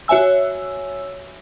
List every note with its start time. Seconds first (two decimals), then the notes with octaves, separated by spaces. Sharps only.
0.08 F#4 C#5 E5 G#5 E6